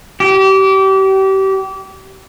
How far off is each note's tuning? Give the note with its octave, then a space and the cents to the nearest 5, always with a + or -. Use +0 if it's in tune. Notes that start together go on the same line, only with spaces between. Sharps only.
G4 -30